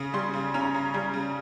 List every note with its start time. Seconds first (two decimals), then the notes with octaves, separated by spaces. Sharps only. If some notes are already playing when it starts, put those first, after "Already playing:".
Already playing: C#3 C#4 D#6
0.14 G3 C6
0.34 C#3
0.54 C#4 A#5
0.74 C#3
0.94 G3
1.14 C#3